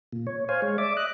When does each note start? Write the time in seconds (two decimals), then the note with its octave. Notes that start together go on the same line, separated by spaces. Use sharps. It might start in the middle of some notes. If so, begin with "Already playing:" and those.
0.13 A#2
0.27 C#5
0.49 C5 C#5 F5 G#5
0.62 G#3 C#5
0.78 D5 E5 D6
0.97 D#5 F#6